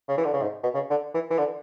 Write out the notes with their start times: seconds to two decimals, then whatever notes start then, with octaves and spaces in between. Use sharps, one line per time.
0.09 C#3
0.18 E3
0.25 D3
0.34 C#3
0.42 G#2
0.63 B2
0.75 C#3
0.90 D3
1.14 E3
1.30 E3
1.38 D3